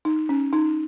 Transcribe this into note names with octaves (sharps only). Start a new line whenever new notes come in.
D#4
C#4
D#4